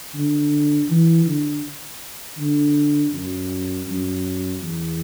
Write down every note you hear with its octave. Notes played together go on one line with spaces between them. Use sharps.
D3
E3
D3
D3
F#2
F#2
E2